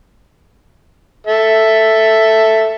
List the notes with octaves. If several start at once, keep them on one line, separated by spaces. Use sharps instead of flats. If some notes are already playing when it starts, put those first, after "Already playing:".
A4 E5